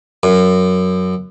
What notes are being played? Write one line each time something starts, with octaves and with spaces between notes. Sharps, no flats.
F#2